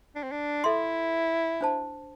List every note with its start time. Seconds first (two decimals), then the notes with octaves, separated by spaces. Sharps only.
0.15 D4
0.23 C4
0.31 D4
0.64 E4 A4 E5 C6
1.61 D4 C5 A5